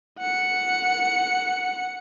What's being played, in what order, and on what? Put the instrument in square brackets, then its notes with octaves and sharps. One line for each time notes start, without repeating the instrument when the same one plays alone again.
[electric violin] F#5 C#7